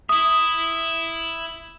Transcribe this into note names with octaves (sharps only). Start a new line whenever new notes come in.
E4 E5 D#6